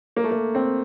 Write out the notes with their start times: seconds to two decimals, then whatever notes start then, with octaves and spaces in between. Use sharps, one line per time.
0.16 A#3
0.24 A3
0.31 A#3
0.55 C4